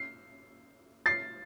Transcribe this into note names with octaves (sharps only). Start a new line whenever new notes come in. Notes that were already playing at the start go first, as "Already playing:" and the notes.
Already playing: C7
A6 C7